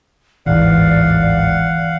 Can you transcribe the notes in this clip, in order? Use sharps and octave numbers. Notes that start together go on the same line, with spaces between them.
D1 G#1 G#2 E3 D5 F5 F#5